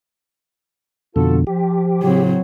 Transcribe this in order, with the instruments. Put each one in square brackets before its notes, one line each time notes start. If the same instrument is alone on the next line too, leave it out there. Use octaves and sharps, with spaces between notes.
[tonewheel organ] F2 B2 D3 [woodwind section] F4 F#4 A4
[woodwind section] F3 [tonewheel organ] G4
[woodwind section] A2 C#3 [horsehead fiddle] F#3 C4